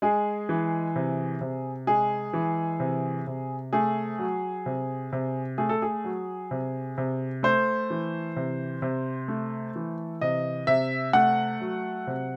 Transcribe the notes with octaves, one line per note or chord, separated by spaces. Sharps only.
G#3 G#4
E3
C3
C3
G#3 G#4
E3
C3
C3
A3 G#4
F#3
C3
C3
A3 G#4
A4
G#4
F#3
C3
C3
A3 C5
E3
C3
C3
A3
E3
C3 D#5
C3 E5
A3 F#5
F#3
C3